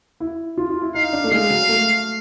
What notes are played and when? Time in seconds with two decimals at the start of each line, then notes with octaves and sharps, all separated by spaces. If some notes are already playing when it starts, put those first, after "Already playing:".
0.20 E4
0.58 F4
0.70 F4
0.82 E4
0.94 D#4 F5
1.13 D4
1.24 A3
1.32 G#3 F5
1.50 F#3
1.69 A3